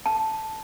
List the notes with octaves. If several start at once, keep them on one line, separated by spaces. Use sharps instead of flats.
A5